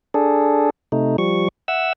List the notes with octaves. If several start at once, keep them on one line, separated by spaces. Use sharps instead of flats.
D4 G#4 A4
C3 A3 D#4
F3 G3 C#6
E5 F#5 E6